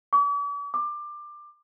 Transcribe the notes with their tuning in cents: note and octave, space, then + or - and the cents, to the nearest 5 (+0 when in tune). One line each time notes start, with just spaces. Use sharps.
D6 -45
D6 +20